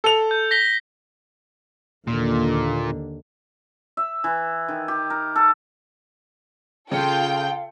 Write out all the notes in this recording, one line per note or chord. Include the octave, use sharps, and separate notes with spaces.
A4 F7
G6
A#6 B6 G7
D#2 A#2 D3
E5
E3
D#3
G4
A#4
A4
C#3 F4 A4 F5 G5 G6 C#7